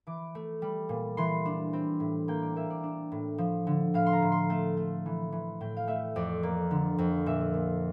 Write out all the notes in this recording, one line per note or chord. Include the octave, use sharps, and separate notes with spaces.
E3 D6
A3
G3
A#2
E3 C6
D4
C4
A2
A#3 G5
D5
A#3 E5
D5
D4
A2
F3
D3
A2 F5
C6
A#5
A2
C6
A3 A5
A3
E3
E3
A2 G5
F5
A3 E5
F2 D5
A#3
D3
F2
A#2 E5
A#2